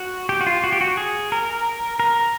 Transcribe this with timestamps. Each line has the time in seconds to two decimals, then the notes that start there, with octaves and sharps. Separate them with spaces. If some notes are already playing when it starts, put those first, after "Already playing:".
Already playing: F#4
0.29 G4
0.41 F#4
0.47 F4
0.64 F#4
0.72 G4
0.81 F#4
0.97 G#4
1.32 A#4
2.00 A#4